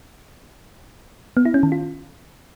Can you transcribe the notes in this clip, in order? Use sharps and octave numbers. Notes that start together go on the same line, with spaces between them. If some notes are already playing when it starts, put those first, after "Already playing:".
B3
E4
C#4
D#3
F4